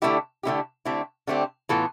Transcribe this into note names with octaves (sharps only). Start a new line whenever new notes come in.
D3 A3 C4 E4 G4
D3 A3 C4 E4 G4
D3 A3 C4 E4 G4
D3 A3 C4 E4 G4
A2 E3 B3 F4 A4